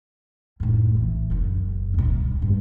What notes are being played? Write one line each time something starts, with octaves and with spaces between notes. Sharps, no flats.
F#2 A2
A#1 E3
F#1 F#2
D2 B2
D#1
G#1 G2